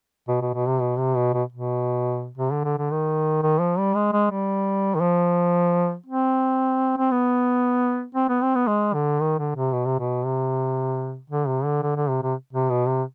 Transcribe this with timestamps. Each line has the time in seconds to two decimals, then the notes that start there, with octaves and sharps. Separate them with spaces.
0.28 B2
0.41 B2
0.54 B2
0.68 C3
0.80 B2
0.98 C3
1.16 B2
1.34 B2
1.53 B2
2.38 C3
2.52 D3
2.64 D3
2.78 D3
2.91 D#3
3.43 D#3
3.60 F3
3.79 G3
3.96 G#3
4.13 G#3
4.31 G3
4.95 D#3
5.01 F3
6.06 C4
6.98 C4
7.11 B3
8.15 C4
8.29 B3
8.42 C4
8.55 B3
8.67 G#3
8.94 D3
9.21 D#3
9.39 D3
9.56 C3
9.73 B2
9.86 C3
9.99 B2
10.25 C3
11.30 D3
11.48 C3
11.65 D3
11.82 D3
11.96 D3
12.09 C3
12.22 C3
12.53 C3
12.70 B2
12.87 C3